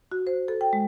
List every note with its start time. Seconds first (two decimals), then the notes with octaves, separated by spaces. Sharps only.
0.12 F#4
0.27 C5
0.48 A4
0.61 G5
0.73 G#3